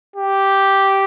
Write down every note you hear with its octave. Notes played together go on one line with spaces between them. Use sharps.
G4